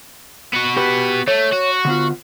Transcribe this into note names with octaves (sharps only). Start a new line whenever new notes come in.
B3 F#4
G4 B4
A3 C#5
F#4
D3 B3 F4